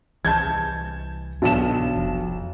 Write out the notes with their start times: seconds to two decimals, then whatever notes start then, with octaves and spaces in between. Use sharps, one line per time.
0.25 C2 E3 A5 G6 G#6
1.42 B1 B2 E3 D4 A5 E7
1.96 F1 F3